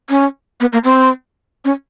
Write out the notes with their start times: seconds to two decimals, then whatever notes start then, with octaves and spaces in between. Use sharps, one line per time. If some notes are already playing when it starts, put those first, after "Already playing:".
0.10 C#4
0.61 B3
0.73 A#3
0.84 C4
1.65 C#4